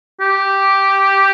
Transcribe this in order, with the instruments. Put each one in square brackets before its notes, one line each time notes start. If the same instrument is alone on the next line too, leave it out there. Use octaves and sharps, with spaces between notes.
[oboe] G4